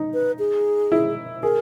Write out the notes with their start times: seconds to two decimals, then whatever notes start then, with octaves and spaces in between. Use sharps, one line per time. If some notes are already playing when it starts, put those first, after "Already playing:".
Already playing: D#4
0.14 B4
0.39 G#4
0.92 E4
1.43 G#4 A#4